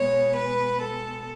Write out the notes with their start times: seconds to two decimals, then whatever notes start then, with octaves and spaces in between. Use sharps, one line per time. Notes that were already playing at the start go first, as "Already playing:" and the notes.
Already playing: B2 G#3 B3 C#5
0.35 B4
0.80 A4